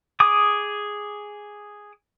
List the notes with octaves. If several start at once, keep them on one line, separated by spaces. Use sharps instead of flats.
G#4 D6 D#6